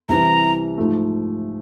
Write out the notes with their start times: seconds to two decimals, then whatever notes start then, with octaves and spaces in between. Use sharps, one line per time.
0.09 C2 C3 E3 A#5
0.78 G#2 F3 A3